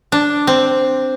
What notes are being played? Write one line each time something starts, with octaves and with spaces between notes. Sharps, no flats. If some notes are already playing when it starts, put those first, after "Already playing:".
D4
C4